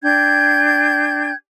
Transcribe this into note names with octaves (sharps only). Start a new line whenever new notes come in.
D4 G5 G6 G#6